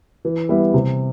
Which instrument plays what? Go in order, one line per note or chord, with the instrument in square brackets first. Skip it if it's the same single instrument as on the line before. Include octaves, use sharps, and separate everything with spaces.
[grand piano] E3
G3 B3 E4
C3